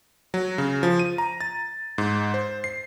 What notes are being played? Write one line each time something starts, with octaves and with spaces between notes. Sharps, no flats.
F#3
C#3
F3
D#7
A#5
A6
G#2
C5
C7